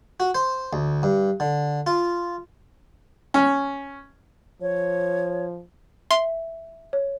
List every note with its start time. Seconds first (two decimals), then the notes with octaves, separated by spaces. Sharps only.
0.20 F#4
0.35 C5
0.73 D2
1.03 G2
1.40 D3
1.87 F4
3.34 C#4
4.61 F3 C#5
6.11 E5 C6
6.93 C#5